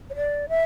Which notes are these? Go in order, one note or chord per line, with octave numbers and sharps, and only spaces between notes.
C#5
D5
E5